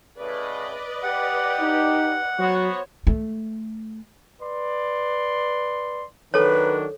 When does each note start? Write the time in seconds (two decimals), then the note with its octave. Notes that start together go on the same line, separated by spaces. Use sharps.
0.17 A2 C#3 B4 D5 D#5
1.03 G4 F#5
1.60 D#4
2.39 F#3 B3 F#4 C5 C#5
3.07 A3
4.41 B4 D5 C6
6.34 D#3 F#3 D4 A4 B4 C#5